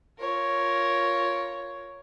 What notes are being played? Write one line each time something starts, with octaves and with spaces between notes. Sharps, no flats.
F4 A#4 C#5